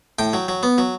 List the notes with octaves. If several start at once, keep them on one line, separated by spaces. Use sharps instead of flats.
A2 G5
F#3
F#3
B3
F#3